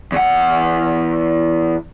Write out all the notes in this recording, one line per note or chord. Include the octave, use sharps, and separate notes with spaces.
E2 F#5